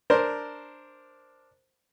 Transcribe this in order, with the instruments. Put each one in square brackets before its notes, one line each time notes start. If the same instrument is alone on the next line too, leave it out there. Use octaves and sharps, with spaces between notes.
[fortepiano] D4 A#4 C5